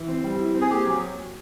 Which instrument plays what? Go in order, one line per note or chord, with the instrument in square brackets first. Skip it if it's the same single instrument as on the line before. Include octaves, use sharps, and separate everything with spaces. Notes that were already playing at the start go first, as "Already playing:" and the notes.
Already playing: [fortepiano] E3
C4
G3
E4
C4
[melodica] G#4
[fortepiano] A#3 [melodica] G4
[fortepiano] F#3